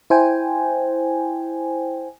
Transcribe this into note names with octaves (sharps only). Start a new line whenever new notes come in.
E4 C5 G5 G#5